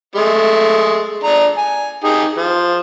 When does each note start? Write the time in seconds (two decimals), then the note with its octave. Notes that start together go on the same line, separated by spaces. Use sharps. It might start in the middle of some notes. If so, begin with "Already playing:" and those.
0.15 G#3 A3
1.24 D4 A#5
1.58 G#5
2.04 D#4 G4 G#4
2.37 F3